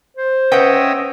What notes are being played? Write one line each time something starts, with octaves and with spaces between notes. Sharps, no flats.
C5
C#4 B4 D#5 E5 F#5 G5